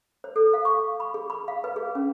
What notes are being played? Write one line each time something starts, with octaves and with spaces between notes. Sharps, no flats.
C5
A4
F5
C#6
B5
G#4
B5
F5
B4
G#4
C#4